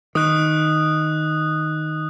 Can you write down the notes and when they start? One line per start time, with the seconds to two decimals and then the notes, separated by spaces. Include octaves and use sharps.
0.15 D#3 D#6 F#6